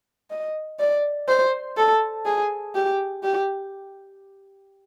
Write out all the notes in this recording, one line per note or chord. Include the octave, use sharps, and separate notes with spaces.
D#5
D5
C5
A4
G#4
G4
G4